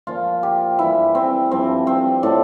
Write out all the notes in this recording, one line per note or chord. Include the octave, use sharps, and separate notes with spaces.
A#2 F3 F4
G4
G2 E3 E4
C4
G2 F3 C4
C4
A2 F3 D4